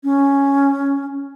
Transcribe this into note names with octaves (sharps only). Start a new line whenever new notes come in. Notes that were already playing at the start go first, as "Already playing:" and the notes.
C#4